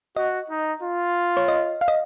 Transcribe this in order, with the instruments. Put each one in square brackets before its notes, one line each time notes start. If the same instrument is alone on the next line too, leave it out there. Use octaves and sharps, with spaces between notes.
[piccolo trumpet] F#4 [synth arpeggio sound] D#5
[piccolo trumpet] D#4
F4
[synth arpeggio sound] C#5
D#5
F5
D#5